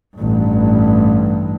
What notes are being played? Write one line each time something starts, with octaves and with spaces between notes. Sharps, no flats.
A1 G2